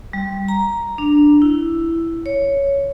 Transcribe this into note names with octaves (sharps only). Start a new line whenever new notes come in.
G3
A#5
D4
E4
C#5